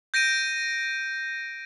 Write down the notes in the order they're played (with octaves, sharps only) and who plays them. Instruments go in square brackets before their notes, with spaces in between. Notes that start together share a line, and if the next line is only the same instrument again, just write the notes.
[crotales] G6 A#6 D7 D#7